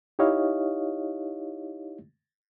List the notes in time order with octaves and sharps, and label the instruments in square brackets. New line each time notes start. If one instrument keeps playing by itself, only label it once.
[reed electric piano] D#4 E4 G4 C#5 D#5 F5